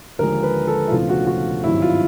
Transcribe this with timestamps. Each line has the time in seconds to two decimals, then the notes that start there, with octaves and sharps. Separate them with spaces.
0.18 D#2 D3 F3 G#3 A#4
0.43 B4
0.67 A4
0.88 E4
0.91 E1 D2 C#3 F3 A3 F4
1.09 F#4
1.27 F#4
1.63 G#1 G2 D#3 F#3 E4
1.82 F4